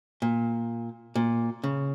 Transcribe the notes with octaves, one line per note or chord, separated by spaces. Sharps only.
A#2
A#2
C#3